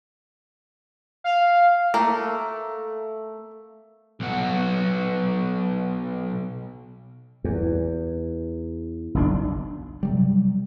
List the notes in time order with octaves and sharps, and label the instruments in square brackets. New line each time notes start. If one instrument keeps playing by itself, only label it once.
[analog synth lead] F5
[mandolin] A3 [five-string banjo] A#3 A#4
[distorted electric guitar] B1 F#4
[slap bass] E2
F#1 B1 D4
[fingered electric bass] C3 F#3 G3